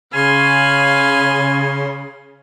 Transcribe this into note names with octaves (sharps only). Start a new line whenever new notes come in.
C#3 F5 G#5 B5 C6